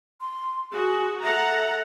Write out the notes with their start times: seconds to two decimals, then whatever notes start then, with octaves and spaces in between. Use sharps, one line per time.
0.21 C6
0.72 F#4 G#4
1.23 A4 E5 F#5 A#5